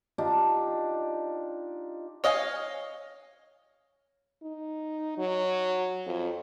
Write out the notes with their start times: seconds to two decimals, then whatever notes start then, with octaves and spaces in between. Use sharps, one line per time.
0.18 D4 D#4 F4 G4
2.24 C#5 D#5 F5 G5 G#5
4.43 D#4
5.18 F#3
6.06 F2